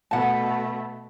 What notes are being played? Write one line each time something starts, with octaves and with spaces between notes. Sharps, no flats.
B2 A3 F#5 A5